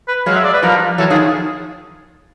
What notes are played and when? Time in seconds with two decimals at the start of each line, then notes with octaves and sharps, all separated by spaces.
0.08 B4
0.26 F#3 G#3 F5
0.36 E5
0.45 D5
0.54 B4
0.63 F3 G3 A#4
0.98 E3 F#3 A4
1.10 D#3 F3 G#4